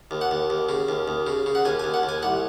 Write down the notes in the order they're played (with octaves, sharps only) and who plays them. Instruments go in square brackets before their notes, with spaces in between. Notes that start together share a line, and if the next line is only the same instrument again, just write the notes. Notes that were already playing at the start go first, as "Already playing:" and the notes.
[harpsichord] D#2
F#5
D#2
D#2
C#3
D#2
D#2
C#3
C#3
F#5
D#2 G#5
D#2 G#5
F#5
D#2
G#5
C2 F#5